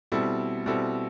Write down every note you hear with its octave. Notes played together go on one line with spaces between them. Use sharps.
B2 G3 C4 E4 A4
B2 G3 C4 E4 A4